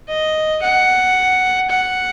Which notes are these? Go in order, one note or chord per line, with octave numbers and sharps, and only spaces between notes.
D#5
F#5
F#5